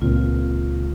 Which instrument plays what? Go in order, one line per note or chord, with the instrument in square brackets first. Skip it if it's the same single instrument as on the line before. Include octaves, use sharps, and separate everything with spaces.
[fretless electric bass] C#2 A#2 C4 [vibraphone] F4